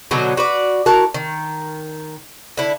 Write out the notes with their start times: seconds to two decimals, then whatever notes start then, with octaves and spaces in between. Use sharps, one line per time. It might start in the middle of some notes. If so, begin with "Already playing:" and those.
0.11 B2 D3 F#3 D#4
0.37 F#4 B4 D5
0.86 E4 F#4 A#4 A5
1.14 D#3
2.57 D3 E4